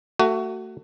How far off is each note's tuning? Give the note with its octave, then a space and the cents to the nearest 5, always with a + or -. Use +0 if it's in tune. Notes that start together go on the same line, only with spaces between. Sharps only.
A3 +30 F#4 +20